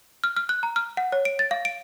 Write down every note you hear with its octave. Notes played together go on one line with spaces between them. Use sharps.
F6
F6
F#6
A#5
F6
F#5
C#5
D7
A6
F5
D7